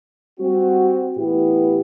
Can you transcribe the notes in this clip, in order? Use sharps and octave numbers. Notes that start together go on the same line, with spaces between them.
G3 C4 F#4
A2 E3 B3 E4 G4